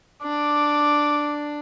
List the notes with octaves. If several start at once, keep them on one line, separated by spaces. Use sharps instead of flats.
D4 D6